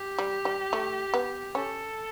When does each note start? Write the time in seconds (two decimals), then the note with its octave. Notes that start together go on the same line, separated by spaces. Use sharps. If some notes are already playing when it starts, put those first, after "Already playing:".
Already playing: G4
0.19 G3
0.45 G3
0.73 A3
1.14 B3
1.55 C#4 A4